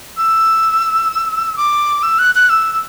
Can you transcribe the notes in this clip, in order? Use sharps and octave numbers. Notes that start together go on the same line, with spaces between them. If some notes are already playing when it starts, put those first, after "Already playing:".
E6
D6
E6
F#6
F#6
E6
E6